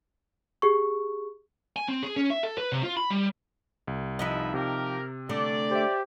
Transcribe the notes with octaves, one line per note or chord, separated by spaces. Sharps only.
G4 G#4 C#6
G#5
C4
G#4
C#4
E5
A4
B4
C3
F4
B5
G3
C2
F3 D#4 B4 D#5 E5 B5
C3 G4 A#4
D3 A3 D5
G4 C5 E5